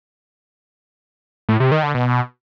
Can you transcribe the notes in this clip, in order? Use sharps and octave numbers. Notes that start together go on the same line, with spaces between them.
A2
C3
D#3
D3
B2